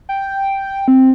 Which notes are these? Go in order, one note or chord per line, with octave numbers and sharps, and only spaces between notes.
G5
C4